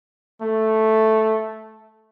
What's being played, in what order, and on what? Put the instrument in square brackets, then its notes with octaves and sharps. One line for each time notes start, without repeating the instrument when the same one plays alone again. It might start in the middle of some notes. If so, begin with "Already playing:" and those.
[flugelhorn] A3